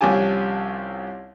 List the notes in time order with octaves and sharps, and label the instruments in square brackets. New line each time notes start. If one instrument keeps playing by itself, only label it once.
[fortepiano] C2 F3 C#4 G4 G#5 A5